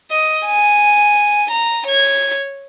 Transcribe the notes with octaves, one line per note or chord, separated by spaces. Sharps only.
D#5
G#5
A#5
C#5 G#6